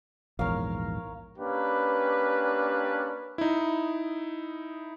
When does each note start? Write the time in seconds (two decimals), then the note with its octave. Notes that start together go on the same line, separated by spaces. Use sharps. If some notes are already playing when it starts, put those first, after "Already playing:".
0.39 A#1 E2 G#2 A#4 C#5 F5
1.38 A#3 C#4 D4 G4 B4
3.38 D#4 E4